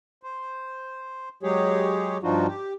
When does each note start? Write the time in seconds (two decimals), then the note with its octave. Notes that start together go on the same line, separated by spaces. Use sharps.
0.23 C5
1.43 F#3 G#3 G4 G#4 C#5
2.23 G2 F3 D4 D#4 F4 F#4
2.47 G4